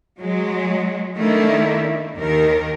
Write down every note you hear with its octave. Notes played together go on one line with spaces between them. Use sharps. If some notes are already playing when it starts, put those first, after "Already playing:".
F#3 G#3
D#3 A3 A#3 D4 E4
D#2 D#3 A#4